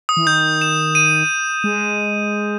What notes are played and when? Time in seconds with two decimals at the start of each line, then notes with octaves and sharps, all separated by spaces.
0.09 D#6
0.17 E3
0.27 D#3 G6
0.61 E7
0.95 D#7
1.64 G#3